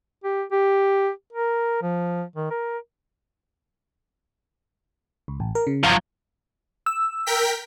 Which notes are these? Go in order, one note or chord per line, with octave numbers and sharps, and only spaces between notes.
G4
G4
A#4
F3
D#3
A#4
C#2
A1
A#4
C#3
G#1 F3 F#3
E6
A#4 G5 B6